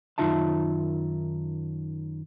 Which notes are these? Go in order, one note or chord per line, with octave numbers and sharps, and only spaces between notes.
F#2 D#3 D#4 F4 E5 A5